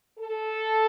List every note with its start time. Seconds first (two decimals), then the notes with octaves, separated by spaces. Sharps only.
0.19 A4